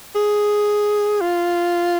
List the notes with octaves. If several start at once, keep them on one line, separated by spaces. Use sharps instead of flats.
G#4
F4